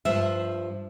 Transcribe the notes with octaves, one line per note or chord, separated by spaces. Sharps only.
G2 F3 E5